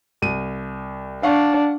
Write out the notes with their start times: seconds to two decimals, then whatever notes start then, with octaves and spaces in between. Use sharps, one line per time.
0.22 C2 D#7
1.23 D4 F5 F#5 C#6